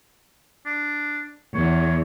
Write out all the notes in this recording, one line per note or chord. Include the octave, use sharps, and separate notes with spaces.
D4
E2 C#5